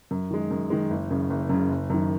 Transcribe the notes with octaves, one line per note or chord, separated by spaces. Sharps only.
F#2
D#3 G#3
F#2
D#3 G#3
F#1
F#2 C#3
F#1
F#2 C#3
F#1
F#2 D#3